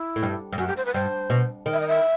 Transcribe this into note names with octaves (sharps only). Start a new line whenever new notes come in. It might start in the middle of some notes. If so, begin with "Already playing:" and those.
Already playing: E4
A2
G2
G2
F#2 F#4
G4
C5
B4
G2 C5
B2
D#3
E5
D#5
E5